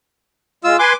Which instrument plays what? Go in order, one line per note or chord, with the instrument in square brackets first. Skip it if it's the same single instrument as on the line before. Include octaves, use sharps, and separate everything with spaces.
[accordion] G#3 [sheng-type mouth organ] F4 E6
[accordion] B4 G#5 C6 [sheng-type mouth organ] D6